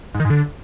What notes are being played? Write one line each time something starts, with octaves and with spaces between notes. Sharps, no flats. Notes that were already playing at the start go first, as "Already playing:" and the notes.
G#2
D#3
G#2
D3